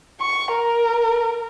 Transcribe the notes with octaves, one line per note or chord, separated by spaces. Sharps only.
C#6
A#4